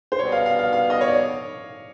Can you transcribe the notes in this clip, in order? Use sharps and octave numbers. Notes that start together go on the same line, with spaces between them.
C5
B2 G3 B3 C#5
F5
F5
F5
F5
D#5
C#5
D5